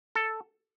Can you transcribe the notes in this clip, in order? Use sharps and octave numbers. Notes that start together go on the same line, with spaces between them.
A4